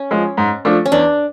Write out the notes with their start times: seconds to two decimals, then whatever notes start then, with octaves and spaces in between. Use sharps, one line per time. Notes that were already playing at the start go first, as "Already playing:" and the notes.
Already playing: C#4
0.11 F3 G#3
0.37 G#2
0.65 F3 A3 D4
0.86 C#4
0.92 E2 D4